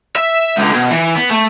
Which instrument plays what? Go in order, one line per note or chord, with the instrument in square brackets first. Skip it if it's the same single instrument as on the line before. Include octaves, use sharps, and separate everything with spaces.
[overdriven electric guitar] E5
C#2 D3
B2
E3
B3
A3